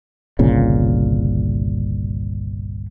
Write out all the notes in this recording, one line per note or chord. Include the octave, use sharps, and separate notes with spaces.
G1 C2 A#2 C#3